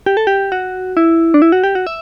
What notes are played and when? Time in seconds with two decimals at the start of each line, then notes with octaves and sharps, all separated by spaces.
0.06 G4
0.17 A4
0.27 G4
0.52 F#4
0.97 E4
1.34 D4
1.42 E4
1.52 F#4
1.64 G4
1.75 F#4
1.87 E5